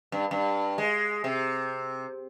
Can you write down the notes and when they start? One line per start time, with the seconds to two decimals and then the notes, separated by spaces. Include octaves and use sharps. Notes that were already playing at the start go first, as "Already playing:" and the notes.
0.12 G2
0.31 G2
0.78 G#3
1.24 C3